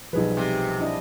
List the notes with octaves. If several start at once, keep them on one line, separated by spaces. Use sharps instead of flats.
B1 F3 G3 G#4 B4
C3
D4 E4 D#5